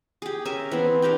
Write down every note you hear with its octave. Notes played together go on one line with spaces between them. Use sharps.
G4 G#4
C#4 A#4 E5 G#5
E3 B3 C4
D4 G4 A#4 G5